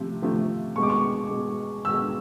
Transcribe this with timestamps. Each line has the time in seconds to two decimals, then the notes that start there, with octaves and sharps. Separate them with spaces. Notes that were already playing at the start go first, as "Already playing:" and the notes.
Already playing: C3 F3 A3
0.22 C3 F3 A3
0.76 B2 G#3 C#6
0.83 D6
0.90 C#6
1.30 B2 G#3
1.85 B2 G#3 E6